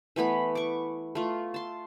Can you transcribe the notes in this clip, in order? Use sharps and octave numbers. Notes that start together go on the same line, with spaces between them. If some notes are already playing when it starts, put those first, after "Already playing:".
E3 A3 B3 B5
C#6 D6
A3 F4
A5 C6